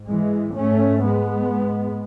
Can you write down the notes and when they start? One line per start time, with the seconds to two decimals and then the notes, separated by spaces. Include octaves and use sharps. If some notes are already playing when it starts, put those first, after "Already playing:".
Already playing: G#2
0.09 E3 G#3
0.58 G#2 A3 C#4
1.05 G#3 B3
1.53 G#2